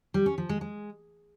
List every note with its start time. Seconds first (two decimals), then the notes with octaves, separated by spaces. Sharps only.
0.14 G3
0.26 C#4
0.38 F3
0.49 G#3
0.61 G#3